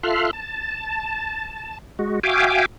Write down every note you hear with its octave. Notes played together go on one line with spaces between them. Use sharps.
F4 A4 E5 C6 F6 F#6
A5
G#3 F#4
F#4 E5 F5 G5 G#5 D6